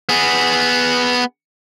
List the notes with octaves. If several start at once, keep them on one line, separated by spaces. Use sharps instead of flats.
B3 G#4